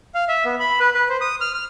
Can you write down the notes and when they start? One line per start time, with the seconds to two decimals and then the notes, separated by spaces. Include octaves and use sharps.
0.14 F5
0.29 E5
0.45 B3
0.60 B5
0.80 B4
0.94 B4
1.09 C5
1.21 D#6
1.41 F6
1.54 F6